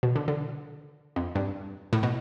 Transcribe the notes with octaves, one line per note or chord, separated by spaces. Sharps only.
B2
D3
D3
F2
G2
A2
B2